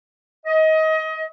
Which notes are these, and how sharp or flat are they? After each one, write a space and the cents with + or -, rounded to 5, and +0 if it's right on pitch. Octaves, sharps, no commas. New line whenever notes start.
D#5 +25